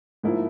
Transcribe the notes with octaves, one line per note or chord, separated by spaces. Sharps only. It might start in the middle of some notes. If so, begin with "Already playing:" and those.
G#2 F3 A#3 E4